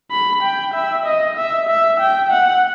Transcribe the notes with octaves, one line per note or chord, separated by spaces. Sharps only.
B5
G5
E5
D#5
E5
E5
G5
F#5